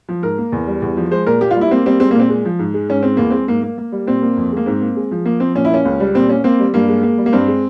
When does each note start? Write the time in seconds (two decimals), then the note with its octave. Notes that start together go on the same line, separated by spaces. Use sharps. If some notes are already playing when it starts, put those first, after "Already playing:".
0.09 F3
0.22 G#2 A#4
0.38 A#3
0.52 E2
0.67 G3
0.82 E2
0.97 F3
1.11 G#3 C5
1.26 A#2 A#4
1.41 A#3 G4
1.51 F4
1.56 G3
1.61 E4
1.71 A#3 C4
1.86 G3 C4
2.00 G#3 C4
2.11 A#3
2.15 A#2 C4
2.30 G#3
2.45 F3
2.59 G#2
2.74 G#3
2.89 G#2 C#4
3.03 G#3 C4
3.17 E2 A#3
3.30 G#3 C4
3.48 G#2 A#3
3.63 A#3
3.78 A#3
3.92 G3
4.07 A#2 C4
4.22 A#3
4.37 F2
4.52 G#3 A#3
4.66 G#2 C4
4.81 A#3
4.97 G#3
5.11 F3
5.25 A#3
5.40 F3 C4
5.56 A#2 C#4
5.65 E4
5.71 A#3 C#4
5.85 C#2
6.00 G3
6.14 A#2 C4
6.29 A#3 C#4
6.44 A#3 C4
6.60 G3
6.74 G2 A#3
6.89 G#3
7.03 A#3
7.18 G3
7.26 A#3
7.33 G2 C4
7.48 G#3